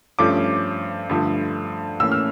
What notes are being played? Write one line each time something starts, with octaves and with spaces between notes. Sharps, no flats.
G2 F3 A3 C#4 D6
G2 D3 F3 A3
A2 E3 A#3 C#4 E6
F6